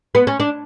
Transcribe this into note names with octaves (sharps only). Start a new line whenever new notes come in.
B3
C#4
D4